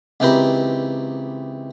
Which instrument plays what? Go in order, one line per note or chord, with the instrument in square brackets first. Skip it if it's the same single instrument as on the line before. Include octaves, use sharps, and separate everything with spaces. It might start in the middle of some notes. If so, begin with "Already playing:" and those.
[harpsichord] C#2 E3 C4 G4 A#4 B5